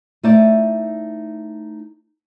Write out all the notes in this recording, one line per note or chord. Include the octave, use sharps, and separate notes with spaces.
A3 D#4 E4 C5 D5